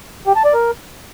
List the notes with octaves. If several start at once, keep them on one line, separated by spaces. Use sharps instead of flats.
G4
A5
D5
A#4